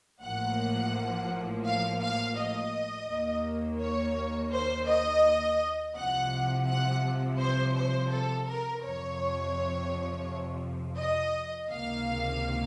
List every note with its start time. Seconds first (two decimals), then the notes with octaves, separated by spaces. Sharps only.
0.21 A1 A2 F3 A#3 F#5
1.65 F5
2.01 F5
2.37 D#5
3.08 D#2 D#3 A#3
3.80 C#5
4.52 C5
4.87 D#5
5.95 C2 C3 F3 F#5
6.67 F#5
7.39 C5
7.75 C5
8.10 A4
8.47 A#4
8.82 F2 C3 F3 C#5
10.97 D#5
11.69 C#2 C3 D#3 A#3 F5